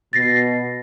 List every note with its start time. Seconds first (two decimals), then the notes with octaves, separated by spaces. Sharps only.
0.13 B2 A6 A#6 C7